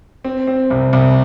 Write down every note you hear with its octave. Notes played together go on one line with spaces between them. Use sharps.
C4
C4
C2
C2